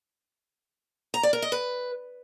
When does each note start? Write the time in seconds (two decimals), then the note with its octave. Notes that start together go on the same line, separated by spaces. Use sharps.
1.14 A#5
1.23 D5
1.33 A#4
1.42 D#5
1.52 B4